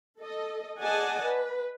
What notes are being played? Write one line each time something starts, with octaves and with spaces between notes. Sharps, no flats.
A4 D#5
G#4 D5 D#5 F#5 G#5 A5
B4